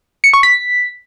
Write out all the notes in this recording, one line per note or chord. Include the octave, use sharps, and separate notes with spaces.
C#7
C#6
B6